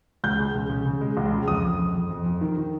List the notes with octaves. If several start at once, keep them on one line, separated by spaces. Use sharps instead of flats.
C#2 G6
G#3
C#3
C#3
C#3
G#3
C#2
C#3
F2 D#6
F2
F2
F2
F2
F2
D#3
D#3